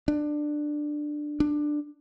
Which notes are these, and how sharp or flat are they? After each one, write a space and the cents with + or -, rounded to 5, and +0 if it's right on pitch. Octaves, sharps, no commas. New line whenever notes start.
D4 +15
D4 +10